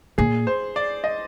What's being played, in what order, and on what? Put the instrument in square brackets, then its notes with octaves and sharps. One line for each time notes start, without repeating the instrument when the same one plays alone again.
[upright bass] A#2 [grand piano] G#4
[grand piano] C5
D5
D#5